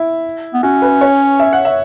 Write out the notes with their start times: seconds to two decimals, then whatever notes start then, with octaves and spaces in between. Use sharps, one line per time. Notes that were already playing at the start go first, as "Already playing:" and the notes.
Already playing: E4
0.54 B3
0.63 C#4 F#4
0.82 B4
1.01 C#5
1.40 E5
1.53 F#5
1.65 E5